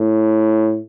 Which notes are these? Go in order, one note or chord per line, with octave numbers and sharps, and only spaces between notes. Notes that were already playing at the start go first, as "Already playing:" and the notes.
Already playing: A2